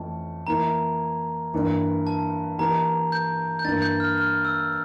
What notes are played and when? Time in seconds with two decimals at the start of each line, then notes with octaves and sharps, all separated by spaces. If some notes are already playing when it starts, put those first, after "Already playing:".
Already playing: F2 E3 A3 C#4 A5
0.47 E3 A#3 E4 A#5
1.54 G2 E3 A#3
2.07 A5
2.59 E3 A#3 E4 G4 A#5
3.12 G6
3.59 G6
3.65 G2 E3 A#3 A6
3.82 G6
4.00 F6
4.18 F6
4.45 E6